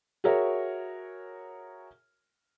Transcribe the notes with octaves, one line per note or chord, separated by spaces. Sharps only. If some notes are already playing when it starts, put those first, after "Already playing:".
F#4 G#4 A#4 C#5 E5